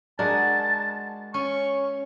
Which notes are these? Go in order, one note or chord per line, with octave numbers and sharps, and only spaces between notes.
G#3 D4 F#4 A#4 A5
C#4 C#6